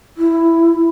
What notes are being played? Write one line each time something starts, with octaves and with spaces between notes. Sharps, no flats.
E4